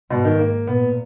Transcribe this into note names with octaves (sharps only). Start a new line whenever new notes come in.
G#2 B2
D#3
A#3
A#2 B3